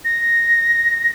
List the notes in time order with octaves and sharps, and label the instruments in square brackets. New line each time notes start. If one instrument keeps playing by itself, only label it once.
[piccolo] A#6